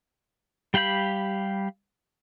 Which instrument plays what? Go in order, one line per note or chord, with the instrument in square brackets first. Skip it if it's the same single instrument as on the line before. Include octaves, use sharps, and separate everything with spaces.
[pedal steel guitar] G3 G4 F5 B5 G6